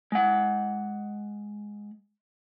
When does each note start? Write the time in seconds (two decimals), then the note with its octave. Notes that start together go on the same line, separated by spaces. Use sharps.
0.12 G#3 F#5